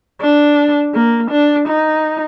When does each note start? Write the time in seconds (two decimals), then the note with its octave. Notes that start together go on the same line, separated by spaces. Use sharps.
0.21 D4
0.94 A#3
1.31 D4
1.68 D#4